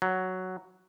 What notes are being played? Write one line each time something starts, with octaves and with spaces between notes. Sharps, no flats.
F#3